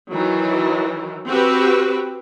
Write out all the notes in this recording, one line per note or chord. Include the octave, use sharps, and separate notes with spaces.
D#3 E3 F#3
C4 F#4 G4 B4